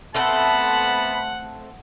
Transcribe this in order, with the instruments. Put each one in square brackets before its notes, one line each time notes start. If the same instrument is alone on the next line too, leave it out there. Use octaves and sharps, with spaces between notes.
[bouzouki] A3 C4 A4 [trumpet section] B3 A5 B5 [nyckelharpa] F#5